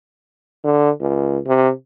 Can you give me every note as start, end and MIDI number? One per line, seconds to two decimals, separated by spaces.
0.64 0.90 50
1.00 1.38 37
1.47 1.70 48